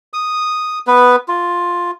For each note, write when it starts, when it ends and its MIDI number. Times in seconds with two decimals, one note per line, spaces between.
0.13 0.79 87
0.87 1.16 59
0.87 1.16 71
1.28 1.91 65